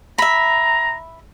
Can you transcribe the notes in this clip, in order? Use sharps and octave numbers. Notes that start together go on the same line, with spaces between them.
E5 A#5 B5